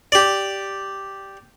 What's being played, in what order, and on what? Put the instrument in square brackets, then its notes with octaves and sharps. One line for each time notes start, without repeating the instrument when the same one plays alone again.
[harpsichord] G4 D5